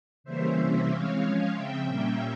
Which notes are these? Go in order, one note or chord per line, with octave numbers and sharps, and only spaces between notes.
C#3 E3 G3 A#3 C#4 C5 E5
C3 E3 G3 A#3 C#4
E3 G#3 C4 C#5 F5
F3 G#3 C#4
C#3 F3 C4 E5 G5
A#2 G3 A#3 C#4